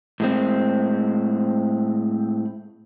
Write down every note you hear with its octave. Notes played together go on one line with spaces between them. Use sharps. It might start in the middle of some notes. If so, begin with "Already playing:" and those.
A2 G#3 C4